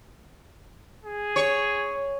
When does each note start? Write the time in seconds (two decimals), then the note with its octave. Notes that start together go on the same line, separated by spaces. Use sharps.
1.04 G#4
1.36 C#5